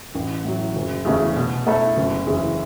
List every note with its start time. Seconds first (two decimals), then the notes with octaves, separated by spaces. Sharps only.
0.15 A1
0.44 A2 F#3
0.76 F#1
1.05 E2 C#3 A3
1.36 B2
1.67 A3 E4 A4
1.97 F#1
2.27 E2 C#3